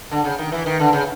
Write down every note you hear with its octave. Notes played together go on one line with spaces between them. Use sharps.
D3
C#3
D#3
E3
D#3
D3
C#3